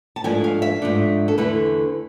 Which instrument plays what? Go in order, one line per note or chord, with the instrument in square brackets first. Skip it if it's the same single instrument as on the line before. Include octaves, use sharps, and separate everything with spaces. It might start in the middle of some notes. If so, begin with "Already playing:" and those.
[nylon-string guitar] A5
G#2 F3 A3 D4 G#5
F5
E5
G#2 F3 A3 D4
A4
E2 D3 A3 E4 B4